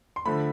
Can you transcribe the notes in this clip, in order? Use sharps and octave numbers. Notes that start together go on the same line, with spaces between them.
C6
D3 F3 A3 B5